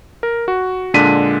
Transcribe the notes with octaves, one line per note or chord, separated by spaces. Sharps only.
A#4
F#4
A#2 D3 G#3 D4 B6 D#7